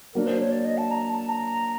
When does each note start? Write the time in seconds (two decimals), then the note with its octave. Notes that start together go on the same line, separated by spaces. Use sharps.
0.14 F#3 A#3 D4 A#4
0.27 C5
0.40 C#5
0.52 D5
0.65 D#5
0.78 A5
0.91 A#5
1.10 A5
1.29 A#5